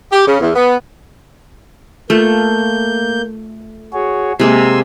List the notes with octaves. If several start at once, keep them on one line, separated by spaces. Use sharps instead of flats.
G4
C#3
E2
B3
A3 A#3 F4 G6
F#4 G#4 C#5
C3 G#3 A#3 G#5 C6 E6